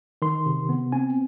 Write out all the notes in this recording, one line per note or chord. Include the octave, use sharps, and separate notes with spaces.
D#3 C6
C3
B3
C4 G#5